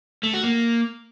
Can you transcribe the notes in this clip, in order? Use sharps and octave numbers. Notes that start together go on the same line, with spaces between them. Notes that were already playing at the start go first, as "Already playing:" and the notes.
A3
F#4
A#3